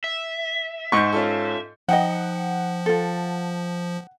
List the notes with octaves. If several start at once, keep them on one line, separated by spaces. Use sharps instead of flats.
E5
G#2 F#5 C#6 G6
C#4 F4 A4
F3 D#4 D#5 F#5 G5
F4 A4